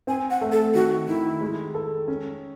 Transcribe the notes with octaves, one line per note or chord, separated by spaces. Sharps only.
C4 G#5
F#5
A3
A4
D#3 F#4
D#3 E4
G#3
A4
C#4